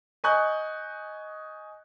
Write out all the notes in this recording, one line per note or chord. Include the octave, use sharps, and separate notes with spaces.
D#5 G#5 C#6 D#6 F#6 G6